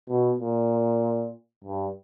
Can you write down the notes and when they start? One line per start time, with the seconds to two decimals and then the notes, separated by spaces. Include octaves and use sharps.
0.09 B2
0.39 A#2
1.64 G2